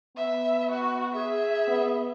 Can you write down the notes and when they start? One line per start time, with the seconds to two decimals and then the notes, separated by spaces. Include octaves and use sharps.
0.16 B3 E5
0.71 F#4
1.14 G#4 E5
1.68 B3